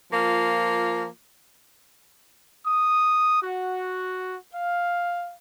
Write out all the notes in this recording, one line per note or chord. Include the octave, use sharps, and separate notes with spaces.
F3 A#3 F4
D#6
F#4
F5